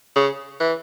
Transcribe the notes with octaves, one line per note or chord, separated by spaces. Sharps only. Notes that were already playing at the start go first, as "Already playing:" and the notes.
C#3
E3